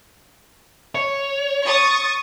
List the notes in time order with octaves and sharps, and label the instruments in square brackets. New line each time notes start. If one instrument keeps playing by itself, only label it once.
[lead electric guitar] C#5
[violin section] C#6 D#6 A6